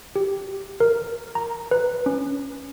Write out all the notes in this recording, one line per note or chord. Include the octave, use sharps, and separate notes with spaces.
G4
A#4
A#5
B4
C#4